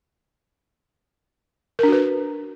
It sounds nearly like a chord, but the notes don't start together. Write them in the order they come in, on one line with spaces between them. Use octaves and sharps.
A#4 D4 F#4 B4